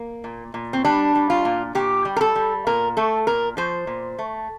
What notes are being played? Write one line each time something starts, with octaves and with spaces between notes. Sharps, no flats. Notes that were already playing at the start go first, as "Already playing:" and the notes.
Already playing: A#3
A#2
A#2
C4
G3 D4
G3
F4
A#2
A#2 G4
G3
A#4
A4
G3
A#2 A#4
A3 A4
A#2 A#4
F3 C5
A#2
A3